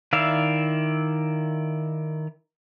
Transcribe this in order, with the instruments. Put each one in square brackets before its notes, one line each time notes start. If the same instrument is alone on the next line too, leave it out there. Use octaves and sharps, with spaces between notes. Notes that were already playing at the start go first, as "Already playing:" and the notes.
[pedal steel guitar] D#3 E4 D5 E5 F5